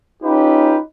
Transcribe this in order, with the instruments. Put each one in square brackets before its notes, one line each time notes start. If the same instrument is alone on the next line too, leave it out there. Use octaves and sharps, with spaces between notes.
[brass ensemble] C#4 D#4 F4 G4 B4